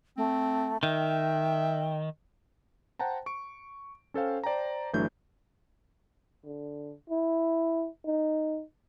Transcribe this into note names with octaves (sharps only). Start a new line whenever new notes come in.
A3 C4
D#3 E5 G5
C5 F#5 G5 A5 A#5
C#6 D7
C#4 A4 C5 F5 G5
C5 D5 G5 A5 A#5
G1 E3 F#3 A3 D4 G6
D3
E4
D#4